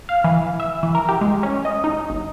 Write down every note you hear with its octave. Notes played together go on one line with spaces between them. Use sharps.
F5
E3
E5
E3
A#4
G4
G#3
C#4
D#5
D#4
G1